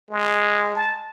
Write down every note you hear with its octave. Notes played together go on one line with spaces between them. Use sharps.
G#3
A5